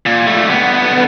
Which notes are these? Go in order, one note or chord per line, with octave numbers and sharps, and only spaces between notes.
A#2
G3 A3
D3 B3